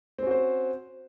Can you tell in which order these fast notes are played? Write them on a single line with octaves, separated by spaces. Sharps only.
C4 C#4 F#4 C5